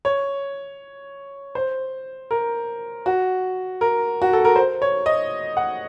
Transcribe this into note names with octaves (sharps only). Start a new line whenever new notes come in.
C#5
C5
A#4
F#4
A#4
F#4
A4
A#4
C5
C#5
D#5
F#5